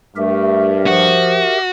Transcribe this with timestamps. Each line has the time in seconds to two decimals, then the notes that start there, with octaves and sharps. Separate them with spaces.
0.16 G2 A3 G4 A#4 E5
0.86 F3 F#4